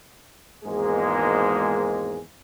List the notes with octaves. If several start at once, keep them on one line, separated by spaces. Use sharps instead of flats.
G#1 E2 G#2 G#3 A#3 G#4